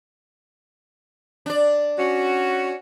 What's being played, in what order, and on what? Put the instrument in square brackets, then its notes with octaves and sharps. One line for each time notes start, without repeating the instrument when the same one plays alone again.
[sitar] D4 D5
[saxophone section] C#4 F#4